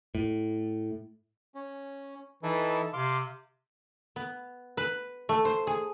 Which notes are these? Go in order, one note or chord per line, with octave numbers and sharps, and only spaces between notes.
A2
C#4
E3 D#4 E4 A4
C3 F5 C6 D6
B3
B4
A3
C5
G#4